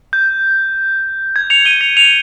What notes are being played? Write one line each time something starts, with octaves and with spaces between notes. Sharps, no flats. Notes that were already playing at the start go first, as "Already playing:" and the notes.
G6
G#6
C#7 F7
D#7 G7
C#7 F7
C#7 F7